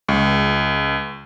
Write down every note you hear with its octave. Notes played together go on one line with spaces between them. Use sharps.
C#2